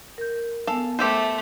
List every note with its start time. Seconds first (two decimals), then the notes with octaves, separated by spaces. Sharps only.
0.18 A#4 G6
0.67 B3 A4 F5 G#5 A5
0.99 A3 G4 A4 C5